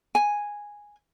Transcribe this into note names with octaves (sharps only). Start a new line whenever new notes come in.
G#5